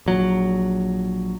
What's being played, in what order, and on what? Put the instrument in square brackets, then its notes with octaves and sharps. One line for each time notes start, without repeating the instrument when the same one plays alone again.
[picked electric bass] A#1 F#3